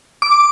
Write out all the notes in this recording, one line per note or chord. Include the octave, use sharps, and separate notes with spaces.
D6